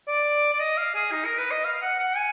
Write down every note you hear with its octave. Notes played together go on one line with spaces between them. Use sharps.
D5
D5
D#5
F5
G#4
D#4
A#4
B4
D#5
F5
F5
F#5
F#5
G#5